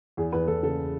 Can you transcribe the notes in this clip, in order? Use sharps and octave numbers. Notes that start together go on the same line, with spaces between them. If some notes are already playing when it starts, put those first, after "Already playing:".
E2 G#4
E2 B4
E2 A4
C#3 A4